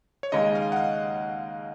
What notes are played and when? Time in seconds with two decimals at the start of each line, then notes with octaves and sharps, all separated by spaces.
0.23 C#5
0.32 D#2 C#3 G#3 D#4 D#5
0.55 F5
0.72 F#5
0.76 F5